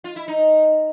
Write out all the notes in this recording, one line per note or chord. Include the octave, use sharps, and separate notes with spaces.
F4
E4
D#4